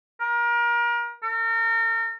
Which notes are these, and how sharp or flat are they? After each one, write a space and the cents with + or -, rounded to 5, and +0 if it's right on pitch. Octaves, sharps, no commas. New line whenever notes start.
A#4 +30
A#4 -40